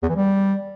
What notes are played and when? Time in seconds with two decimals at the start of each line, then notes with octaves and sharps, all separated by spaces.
0.03 E2
0.09 E3
0.16 G3